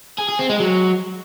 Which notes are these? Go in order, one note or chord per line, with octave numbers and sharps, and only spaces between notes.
G#4
G#4
C4
G#3
F#3